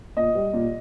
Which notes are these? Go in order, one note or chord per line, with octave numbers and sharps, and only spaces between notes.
A#2 D#5
G3
A#2